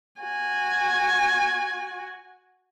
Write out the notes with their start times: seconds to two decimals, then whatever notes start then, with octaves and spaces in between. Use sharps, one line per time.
0.21 F#4 G#5